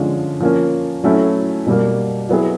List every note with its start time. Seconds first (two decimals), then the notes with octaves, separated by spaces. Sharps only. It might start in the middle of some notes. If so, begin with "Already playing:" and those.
Already playing: D3 F3 G#3 C#4 F4
0.40 F3 A#3 C#4
1.04 F#3 A3 C#4 E4
1.66 B2 G3 A#3
2.29 F#3 B3 E4 G#4